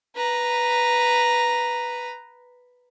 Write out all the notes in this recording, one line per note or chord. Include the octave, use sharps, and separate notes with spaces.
B4 A#5